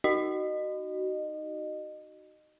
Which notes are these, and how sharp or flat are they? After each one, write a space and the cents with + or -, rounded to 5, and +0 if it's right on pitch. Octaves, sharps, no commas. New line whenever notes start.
D#4 +0 F#4 +25 D#5 -25